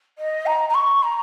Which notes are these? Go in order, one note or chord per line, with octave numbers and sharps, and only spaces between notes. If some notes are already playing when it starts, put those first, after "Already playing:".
D#5
A#5
A#5
C#6
A#5